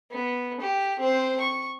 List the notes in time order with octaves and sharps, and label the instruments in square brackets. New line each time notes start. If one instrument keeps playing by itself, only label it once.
[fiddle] B3
G4
C4 C5
C#6